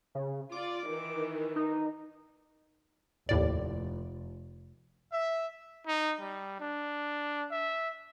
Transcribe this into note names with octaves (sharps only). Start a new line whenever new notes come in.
C#3
F4 D5 D6
D#3 E3
D#4
F1 D#2 A2 D5
E5
D#4
G3
D4
E5